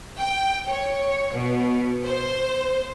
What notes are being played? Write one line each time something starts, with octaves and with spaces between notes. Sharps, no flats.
G5
C#5
B2
C5